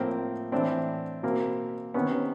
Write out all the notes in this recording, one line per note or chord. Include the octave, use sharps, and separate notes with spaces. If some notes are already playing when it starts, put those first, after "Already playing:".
Already playing: A2 F3 A#3 C4
A2 E3 C4 D4
B2 A#3 C4
C3 D#3 B3 C#4